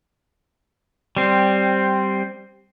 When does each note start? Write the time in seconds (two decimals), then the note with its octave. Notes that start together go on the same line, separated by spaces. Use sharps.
1.16 G3 C4